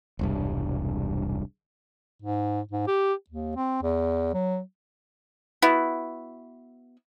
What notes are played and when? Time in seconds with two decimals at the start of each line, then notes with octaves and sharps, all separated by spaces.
0.19 E1 C2 G2
2.22 G#2
2.71 G#2
2.87 G4
3.30 D#2
3.56 C4
3.82 E2
4.34 F#3
5.62 B3 E4 F#4